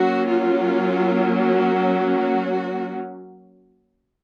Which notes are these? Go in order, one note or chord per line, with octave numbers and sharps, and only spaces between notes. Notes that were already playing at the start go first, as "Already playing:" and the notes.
Already playing: F#3 A#3 C#4 F#4
F4
F#4
F#4